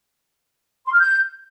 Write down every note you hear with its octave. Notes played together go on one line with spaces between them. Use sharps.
C6
F6
G6